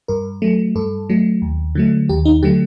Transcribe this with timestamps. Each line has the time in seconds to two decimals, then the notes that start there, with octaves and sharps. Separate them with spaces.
0.08 G2 A#4
0.42 F#3 A3
0.75 G2 A4
1.09 F#3 A3
1.42 D#2
1.75 D3 F#3 A3
2.09 D#2 G4
2.25 D#4
2.43 D3 F#3 A3 G4